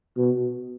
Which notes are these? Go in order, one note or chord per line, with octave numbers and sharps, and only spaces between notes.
B2